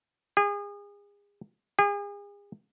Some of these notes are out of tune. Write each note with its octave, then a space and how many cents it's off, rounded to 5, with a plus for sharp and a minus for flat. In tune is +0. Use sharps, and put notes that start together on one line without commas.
G#4 -35
G#4 -40